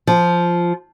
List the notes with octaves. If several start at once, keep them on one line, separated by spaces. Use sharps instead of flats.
F3